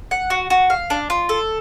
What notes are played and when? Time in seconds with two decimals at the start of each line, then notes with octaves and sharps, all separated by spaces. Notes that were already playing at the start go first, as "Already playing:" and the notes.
0.11 F#5
0.30 F#4
0.50 F#4
0.70 F5
0.90 D4
1.10 F4
1.29 A4